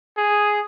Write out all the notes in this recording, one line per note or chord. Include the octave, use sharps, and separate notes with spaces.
G#4